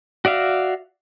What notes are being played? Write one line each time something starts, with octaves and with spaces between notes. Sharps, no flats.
F#4 D5 E5 F5